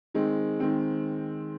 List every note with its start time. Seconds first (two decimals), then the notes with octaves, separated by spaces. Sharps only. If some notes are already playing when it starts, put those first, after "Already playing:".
0.14 D#3 G#3 C4
0.60 D#3 G#3 C4